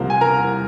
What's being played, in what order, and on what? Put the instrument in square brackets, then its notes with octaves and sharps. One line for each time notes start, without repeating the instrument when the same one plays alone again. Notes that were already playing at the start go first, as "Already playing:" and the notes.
Already playing: [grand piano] C2 C3 F3 A#3 C5
G#5
A#4 A#5